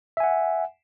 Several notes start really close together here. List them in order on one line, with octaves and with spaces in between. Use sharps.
E5 G#5 F#5